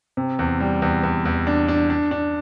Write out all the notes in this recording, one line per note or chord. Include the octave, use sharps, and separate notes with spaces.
C3
E2
G3
E2
E2
E2
D4
D4
D4
D4